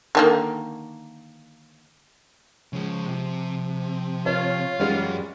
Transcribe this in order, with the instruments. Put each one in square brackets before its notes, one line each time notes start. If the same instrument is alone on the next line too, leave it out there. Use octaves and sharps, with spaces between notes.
[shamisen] D3 D#3 A#3
[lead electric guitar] C#3 G#3 [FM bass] F3
[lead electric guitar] C3
[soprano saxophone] F4 [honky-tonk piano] C#5
[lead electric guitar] F#2 F#5 [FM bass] E3 [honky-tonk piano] G3 G#3 C#4